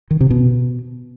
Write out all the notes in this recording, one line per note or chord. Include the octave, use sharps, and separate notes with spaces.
D#3
C3
B2